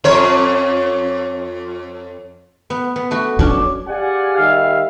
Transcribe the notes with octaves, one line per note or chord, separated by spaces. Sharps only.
F2 C#5
B3
B3
A3 F#4
F#3 C#4 D4
G4 G#4 D5 F5 F#5 G#5
D#3 G3 E5 F5